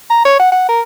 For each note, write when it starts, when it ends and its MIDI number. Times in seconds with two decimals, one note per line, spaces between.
0.10 0.23 82
0.25 0.39 73
0.40 0.49 78
0.52 0.64 78
0.69 0.81 70